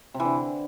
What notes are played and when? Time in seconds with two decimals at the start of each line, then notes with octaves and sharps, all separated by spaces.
0.14 C3
0.20 E3
0.25 D3